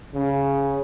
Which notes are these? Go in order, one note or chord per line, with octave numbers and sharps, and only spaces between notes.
C#3